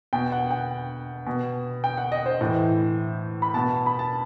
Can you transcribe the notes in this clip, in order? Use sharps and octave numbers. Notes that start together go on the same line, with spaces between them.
B2 G5
F#5
G5
B2
G5
F#5
D#5
C5
A2 E3
B5
B2 A5
B5
A5